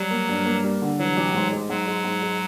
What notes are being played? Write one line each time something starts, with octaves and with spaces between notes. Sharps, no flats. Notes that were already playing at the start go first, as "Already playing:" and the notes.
Already playing: F#3 G3
A#3
G2
A#3
G3
D3
E3 F#3
A1
G#2
G#3
G#2 F#3
G#3
G#2
G#3